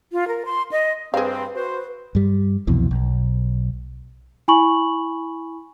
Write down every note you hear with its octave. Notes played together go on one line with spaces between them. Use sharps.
F4
A#4
C6
D#5
G2 C4 G#4 B4 F5
F#4 B4 C5
G2 G3
C2 F2 B2 E3
B1
E4 G#5 B5 C#6 F#7